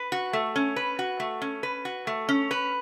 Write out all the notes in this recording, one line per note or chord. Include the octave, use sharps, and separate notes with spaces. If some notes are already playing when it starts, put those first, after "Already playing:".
Already playing: B4
F#4
A3
C#4
B4
F#4
A3
C#4
B4
F#4
A3
C#4
B4